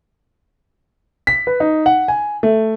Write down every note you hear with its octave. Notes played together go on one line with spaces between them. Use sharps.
B6
B4
D#4
F#5
G#5
A3